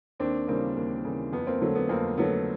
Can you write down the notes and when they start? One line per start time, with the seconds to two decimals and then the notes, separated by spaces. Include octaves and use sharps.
0.20 D#2 C4 D4
0.48 C#3 E3 G3 A#3 C4
0.76 D#2
1.05 C#3 E3 G3
1.33 F2 B3
1.47 A#3 C4
1.61 D3 F#3 A3
1.75 B3
1.89 F2 A#3 C4
2.18 D3 F#3 A3 B3